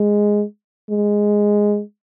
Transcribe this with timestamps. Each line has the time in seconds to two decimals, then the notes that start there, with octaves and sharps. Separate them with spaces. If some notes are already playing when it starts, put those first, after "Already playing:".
Already playing: G#3
0.90 G#3